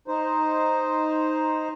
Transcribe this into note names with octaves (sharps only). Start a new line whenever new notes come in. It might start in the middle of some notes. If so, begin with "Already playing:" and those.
D#4 C5